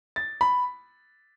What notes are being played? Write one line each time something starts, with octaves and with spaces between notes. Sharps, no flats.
A6
B5